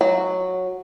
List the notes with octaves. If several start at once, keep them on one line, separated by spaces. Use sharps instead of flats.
F#3